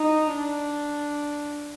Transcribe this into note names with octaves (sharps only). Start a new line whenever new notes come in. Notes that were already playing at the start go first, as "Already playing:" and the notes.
Already playing: D#4
D4